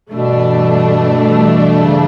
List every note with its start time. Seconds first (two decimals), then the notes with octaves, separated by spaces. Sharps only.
0.10 G2 B2 E3 A3 D4
1.85 C#3